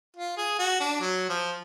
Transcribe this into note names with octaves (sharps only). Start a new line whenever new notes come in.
F4
G#4
F#4
D4
F#3
F3